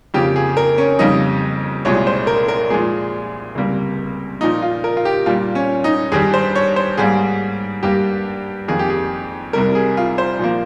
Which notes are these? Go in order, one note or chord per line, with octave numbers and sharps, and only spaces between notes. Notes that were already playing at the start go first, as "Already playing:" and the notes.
F2 C#3 F3 A#3 G4
G#4
A#4
C#4
F2 C#3 G3 A#3 D#4
C2 A#2 G#3 C#5
C5
A#4
A#4
A#2 F3 G#3 G#4
C#2 C3 G3 A#3
A#2 F3 A#3 D#4
F4
A#4
F4
G4
A#2 G3 A#3 F4
C#4
D#4
G2 D#3 G3 G#4
C5
C#5
C5
G#2 G3 A#3 G#4
G2 G3 A#3 G4
F2 D#3 A#3 G#4
G4
G#4
C2 C3 G3 A#4
G#4
F4
C5
A#2 F3 A#3